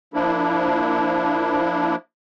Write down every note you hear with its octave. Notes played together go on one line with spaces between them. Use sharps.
F3 A#3 D4 E4